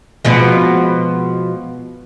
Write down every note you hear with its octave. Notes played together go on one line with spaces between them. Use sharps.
B2 F3 G#3